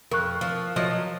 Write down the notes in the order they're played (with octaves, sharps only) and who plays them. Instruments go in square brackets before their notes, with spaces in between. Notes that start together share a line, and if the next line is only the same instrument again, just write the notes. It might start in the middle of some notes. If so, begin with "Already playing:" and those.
[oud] F2 [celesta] A#4 C#6 F#6
[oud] F3
F3 F#3 D#5